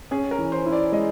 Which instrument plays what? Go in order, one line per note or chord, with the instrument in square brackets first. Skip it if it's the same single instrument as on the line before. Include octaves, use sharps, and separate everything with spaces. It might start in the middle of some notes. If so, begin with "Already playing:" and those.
[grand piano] C#4 [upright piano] G#4
[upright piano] A#4
[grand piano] E3
[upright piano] C5
[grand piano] E4
[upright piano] D5
[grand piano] G#3 [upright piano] D#5